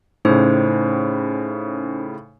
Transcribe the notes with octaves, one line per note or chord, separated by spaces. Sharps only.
A2 C#3 C#4 D#4 C5